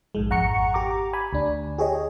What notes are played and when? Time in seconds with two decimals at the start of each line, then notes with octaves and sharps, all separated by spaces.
0.15 A#1 G#2 G#3
0.30 G#1 F2 F#5 A#5 C#6 C#7
0.74 G4 A#5 D6
1.13 G#5 B5
1.33 D2 D4
1.78 G4 G#4 C#5 D#5